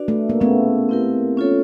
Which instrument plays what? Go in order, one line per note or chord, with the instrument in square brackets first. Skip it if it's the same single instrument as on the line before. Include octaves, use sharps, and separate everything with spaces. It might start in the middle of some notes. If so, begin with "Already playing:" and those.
Already playing: [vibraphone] D4 F#4 B4 D5
[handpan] A3
A#3
[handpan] A3 B3 [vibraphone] C#4 E4 G#4
[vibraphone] C4 E4 G4 A#4
C#4 F4 A4 C#5